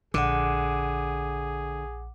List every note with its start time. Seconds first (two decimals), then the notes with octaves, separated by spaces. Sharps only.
0.14 A#1 D3 G#4 F#5 D6